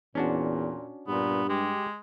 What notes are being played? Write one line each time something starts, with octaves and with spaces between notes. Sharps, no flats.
E2 A#2 C#4 D4 F#4
G2 A#2 B3
G#3 G4